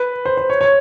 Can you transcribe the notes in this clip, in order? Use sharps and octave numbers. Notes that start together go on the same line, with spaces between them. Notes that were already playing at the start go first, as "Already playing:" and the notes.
Already playing: B4
C5
C5
C#5
C#5